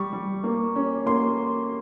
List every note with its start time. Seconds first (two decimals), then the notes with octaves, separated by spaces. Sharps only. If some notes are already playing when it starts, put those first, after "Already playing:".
Already playing: G3 C#6
0.13 G3
0.44 A#3
0.76 C#4
1.06 A#3 C6